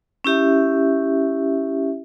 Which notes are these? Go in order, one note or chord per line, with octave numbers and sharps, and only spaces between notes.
C#4 E4 G4 E5